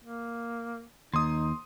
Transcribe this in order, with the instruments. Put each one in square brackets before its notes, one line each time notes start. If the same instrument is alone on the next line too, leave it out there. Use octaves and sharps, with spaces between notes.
[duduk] A#3
[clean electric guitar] D#2 [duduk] D#4 [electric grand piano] C6 D#6